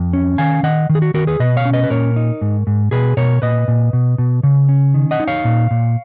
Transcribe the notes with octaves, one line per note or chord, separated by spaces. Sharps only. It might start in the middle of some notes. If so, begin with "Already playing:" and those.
Already playing: F2
C#4
D#3 F5 G#5
D#3 D#5 F#5
D#3
G#4
F#4
D#3 F#4 A#4
G#4 B4
B2 B4 D#5
C#5 F5
C#4
B4 D#5
B4
A#2 A#4 C#5
D#4
G#2
G#2
B2 G#4 B4
B2 A#4 C#5
A#2 B4 D#5
A#2
B2
B2
C#3
C#4
D#3
D#5 F#5
D#4
C#5 F5
A#2
A#2